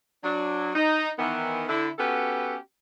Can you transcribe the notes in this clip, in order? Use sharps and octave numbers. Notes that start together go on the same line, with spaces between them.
F#3 D4
D#4
D#3 E3 B3
D3 E4
B3 C#4 F#4 G4 A4 B4